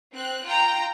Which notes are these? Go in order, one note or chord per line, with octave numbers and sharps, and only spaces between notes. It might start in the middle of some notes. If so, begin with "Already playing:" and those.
C4 F#6
F4 G5 A#5